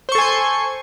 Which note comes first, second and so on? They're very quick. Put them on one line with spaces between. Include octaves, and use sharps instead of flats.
C5 C#6 A4 G#5 C6